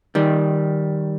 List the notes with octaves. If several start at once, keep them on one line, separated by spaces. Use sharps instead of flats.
D#3 G3